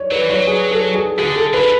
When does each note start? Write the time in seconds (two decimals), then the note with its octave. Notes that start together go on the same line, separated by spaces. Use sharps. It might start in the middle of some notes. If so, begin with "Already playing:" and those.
Already playing: C#5 D5
0.11 F#3 B4
0.21 E3
0.30 F#3 C#5
0.47 G#4
0.71 A4
0.95 G#4
1.18 D3 G#4
1.36 A4
1.53 D3 B4
1.62 E3